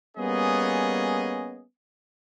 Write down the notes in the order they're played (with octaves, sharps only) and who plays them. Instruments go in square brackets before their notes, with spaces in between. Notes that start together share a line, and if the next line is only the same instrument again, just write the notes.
[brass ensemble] G3 A#3 B3 C#4 G#4 D#5